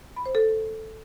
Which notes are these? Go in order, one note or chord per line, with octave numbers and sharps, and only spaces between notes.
B5
C5
A4